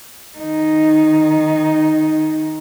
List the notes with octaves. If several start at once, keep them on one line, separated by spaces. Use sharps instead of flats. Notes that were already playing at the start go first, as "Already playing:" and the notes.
D#3 D#4